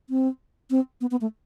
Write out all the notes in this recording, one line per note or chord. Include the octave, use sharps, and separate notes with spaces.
C4
C4
B3
B3
A3